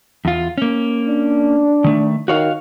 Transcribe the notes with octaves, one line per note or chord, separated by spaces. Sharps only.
E2 F4
A#3 C#4
D4
D#3 A3
D#3 F#4 C#5 F5